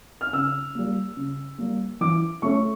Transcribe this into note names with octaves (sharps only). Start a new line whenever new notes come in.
F6
C#3 E6
G3 A#3
C#3
G3 A#3
E3 D6
A3 C#4 C#6